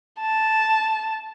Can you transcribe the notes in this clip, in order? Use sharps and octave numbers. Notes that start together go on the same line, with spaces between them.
A5